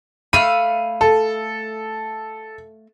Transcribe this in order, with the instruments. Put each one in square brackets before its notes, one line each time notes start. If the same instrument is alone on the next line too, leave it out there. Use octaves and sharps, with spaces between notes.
[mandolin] A3 F5 B5 [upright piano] D#7
[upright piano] A4